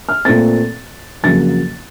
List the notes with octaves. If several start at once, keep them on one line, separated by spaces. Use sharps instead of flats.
F6
A#2 A3 C4 A6
F2 C#3 F#3 A#3 A6